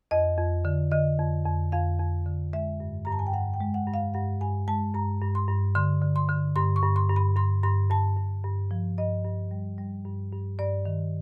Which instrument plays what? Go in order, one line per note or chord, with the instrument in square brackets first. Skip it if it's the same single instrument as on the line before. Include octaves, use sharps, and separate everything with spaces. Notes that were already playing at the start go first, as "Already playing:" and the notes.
[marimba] F2 D#5
F2
D3
D3 D#5
F2
F2
F2 F5
F2
D3
G#3 E5
G2
G2 A#5
A5
G#5
G5
G2 F#5
G5
G#3
F#5
G2
F5
G2 F#5
G2 G#5
G#3 A5
G2 A#5
G2
C6
G2
D3 C6
D3
C6
D3
G2 C6
C#6
G2
C6
G2
B5
G2 C6
G2 C6
G2 A5
G2
G2
F3
G2 D#5
G2
G3
G3
G2
G2
G2 D5
D#3